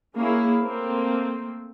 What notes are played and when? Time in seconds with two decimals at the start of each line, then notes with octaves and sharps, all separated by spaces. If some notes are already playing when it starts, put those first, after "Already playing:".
0.15 A#3 C#4 E4 G#4
0.60 A3 A#3 C4